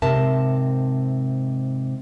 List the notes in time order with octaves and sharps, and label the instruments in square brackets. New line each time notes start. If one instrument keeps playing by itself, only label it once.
[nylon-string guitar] G#2 C3 A#4 E5 A5